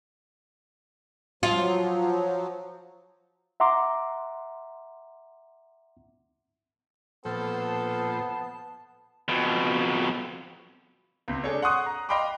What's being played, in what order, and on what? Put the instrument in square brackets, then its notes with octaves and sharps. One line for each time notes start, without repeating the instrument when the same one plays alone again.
[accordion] F3 F#3 [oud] F4
[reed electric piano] E5 F#5 A#5 C6 D6
[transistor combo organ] A#2 F3 C5 [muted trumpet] B3 [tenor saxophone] A4 [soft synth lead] A5
[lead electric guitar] F2 B2
[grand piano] C#2 C3
D4 G#4 A4 C#5
F#5 C6 C#6 D#6 F#6
A#5
D#5 F5 G5 B5 C6 D6